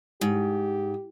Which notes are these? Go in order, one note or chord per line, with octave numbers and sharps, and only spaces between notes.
G#2 G4